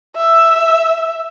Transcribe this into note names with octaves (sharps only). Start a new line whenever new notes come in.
E5